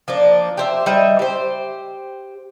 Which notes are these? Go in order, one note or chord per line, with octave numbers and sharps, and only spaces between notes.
F3 A#3 D4
G4 C5 E5
G3 D#4 E5
G4 C5